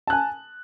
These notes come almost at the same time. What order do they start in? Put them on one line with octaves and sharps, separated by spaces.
A5 F#6 G#5